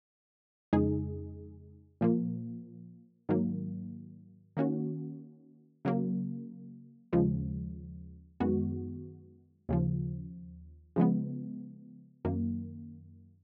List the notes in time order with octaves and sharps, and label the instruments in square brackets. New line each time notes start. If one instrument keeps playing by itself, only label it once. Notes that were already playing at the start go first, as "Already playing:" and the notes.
[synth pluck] F2 C#3 G#3 D#4 G#4
A#2 F3 A#3
G#2 D#3 F#3 A#3
D#3 A#3 C#4 F#4
C#3 F#3 A#3
D#2 C#3 F3 G#3
F#2 D#3 G#3 B3 F#4
D#2 C#3 F3
C#3 F3 G#3 B3
F#2 D#3 A#3